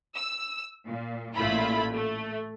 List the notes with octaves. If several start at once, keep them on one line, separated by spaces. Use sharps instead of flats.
E6
A#2
A1 A#2 A3 E4 F4 B5
A3